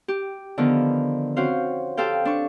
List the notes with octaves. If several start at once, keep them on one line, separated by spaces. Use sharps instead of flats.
G4
D3 D#3 F3 B3
C4 C#4 F#4 C5 F5
G4 A4 C5 F5 G5
D4 C#6